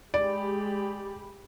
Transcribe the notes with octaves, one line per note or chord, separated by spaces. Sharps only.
G#3 G4 D5 B5